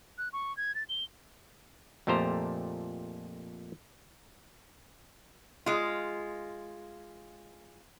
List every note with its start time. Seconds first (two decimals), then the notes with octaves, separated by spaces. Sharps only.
0.18 F#6
0.33 C#6
0.57 G#6
0.75 A6
0.89 G7
2.07 F2 A#2 A3 G4 C5 A#5
5.66 G#3 F4